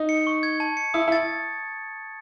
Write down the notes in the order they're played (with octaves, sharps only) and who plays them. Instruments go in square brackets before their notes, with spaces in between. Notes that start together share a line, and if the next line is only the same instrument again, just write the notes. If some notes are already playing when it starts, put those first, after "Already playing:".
Already playing: [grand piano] D#4
[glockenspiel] C#7
C#6
G#6
A5
C#7
[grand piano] E4 [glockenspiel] D#6
[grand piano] E4
[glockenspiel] A6